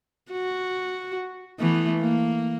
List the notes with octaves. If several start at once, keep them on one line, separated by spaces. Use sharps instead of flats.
F#4
E3 A3 B3
A#3